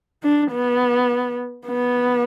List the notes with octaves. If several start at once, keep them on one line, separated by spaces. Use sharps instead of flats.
D4
B3
B3